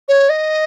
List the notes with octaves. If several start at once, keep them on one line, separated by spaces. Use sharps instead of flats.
C#5
D#5